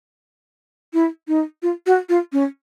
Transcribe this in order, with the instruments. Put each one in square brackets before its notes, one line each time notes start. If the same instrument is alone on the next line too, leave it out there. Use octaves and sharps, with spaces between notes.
[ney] E4
D#4
F4
F#4
F4
C#4